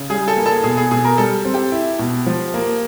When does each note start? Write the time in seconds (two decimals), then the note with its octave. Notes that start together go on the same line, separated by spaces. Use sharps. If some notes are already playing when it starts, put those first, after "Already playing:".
Already playing: C#3
0.10 G3 G#4
0.28 A4
0.37 A#3
0.46 A4
0.63 B2 G#4
0.77 G#4
0.91 B2 G#4
1.04 A#4
1.18 G3 A4
1.45 C4
1.54 G4
1.72 E4
1.99 B2
2.26 F3
2.54 A#3